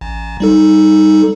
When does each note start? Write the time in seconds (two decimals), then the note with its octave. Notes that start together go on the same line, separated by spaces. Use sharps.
0.01 A1
0.40 G3 D#4 A4